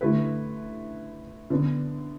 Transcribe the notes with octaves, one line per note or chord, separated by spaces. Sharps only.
D3 A3 E4 B4
D3 B3 D4